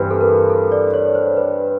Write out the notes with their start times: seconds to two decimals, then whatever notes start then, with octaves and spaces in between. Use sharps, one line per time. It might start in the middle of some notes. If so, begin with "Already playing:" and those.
Already playing: G2 E3 G3 C4 B4
0.11 A4
0.21 A#4
0.49 A4
0.72 D5
0.94 C#5
1.15 C5
1.37 B4